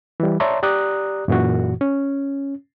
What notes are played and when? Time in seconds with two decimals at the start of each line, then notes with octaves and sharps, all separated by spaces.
0.20 E3 G3
0.40 C#5 D5 E5 A5 A#5 C6
0.63 G4 D5 A#5 D#6 F#6
1.28 F#2 A#2 E3 F#4
1.81 C#4